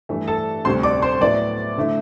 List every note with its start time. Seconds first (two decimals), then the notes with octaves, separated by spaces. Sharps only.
0.09 G2 E3 A3
0.28 A4 A5
0.65 D2 C3 G3 C5 C6
0.83 D5 D6
1.02 C5 C6
1.21 A2 F#3 B3 E4 D5 D6
1.78 D3 A3 E4